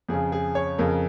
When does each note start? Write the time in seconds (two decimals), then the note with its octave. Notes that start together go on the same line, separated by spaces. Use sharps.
0.09 F2 C#3 G#4
0.32 G#4
0.55 C#5
0.78 F2 C#3 A#4